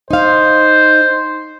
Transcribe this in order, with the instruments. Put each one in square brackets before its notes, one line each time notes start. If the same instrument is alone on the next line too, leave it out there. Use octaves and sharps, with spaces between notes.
[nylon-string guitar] D#4 F5 [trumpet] C5